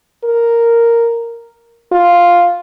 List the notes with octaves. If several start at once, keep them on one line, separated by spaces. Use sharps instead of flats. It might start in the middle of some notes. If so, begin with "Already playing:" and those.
A#4
F4